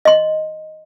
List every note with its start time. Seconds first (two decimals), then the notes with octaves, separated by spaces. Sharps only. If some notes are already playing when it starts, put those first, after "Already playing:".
0.05 D#5 C6